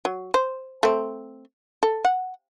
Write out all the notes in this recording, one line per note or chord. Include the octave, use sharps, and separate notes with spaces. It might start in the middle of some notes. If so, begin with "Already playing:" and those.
F#3
C5
A3 C4
A4
F#5